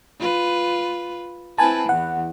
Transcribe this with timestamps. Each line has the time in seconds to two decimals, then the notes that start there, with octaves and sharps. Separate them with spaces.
0.20 F4 B4
1.58 C4 E4 B4 G#5 A5
1.89 E2 F#5